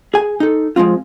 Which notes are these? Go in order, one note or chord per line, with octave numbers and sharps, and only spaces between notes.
G#4 G#5
D#4 A4
F3 G#3 A3 C4 F4